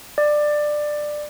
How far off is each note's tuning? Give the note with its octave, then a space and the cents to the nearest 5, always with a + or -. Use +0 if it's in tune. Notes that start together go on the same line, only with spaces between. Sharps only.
D5 +15